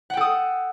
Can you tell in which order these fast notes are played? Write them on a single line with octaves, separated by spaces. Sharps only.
F#5 G5 A4 D#6